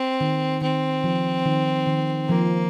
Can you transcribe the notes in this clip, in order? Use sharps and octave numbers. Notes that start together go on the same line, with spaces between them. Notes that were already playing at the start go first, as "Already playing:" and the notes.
Already playing: C4
D#3
D#3 C4
F3
D#3
D#3
F3 A#3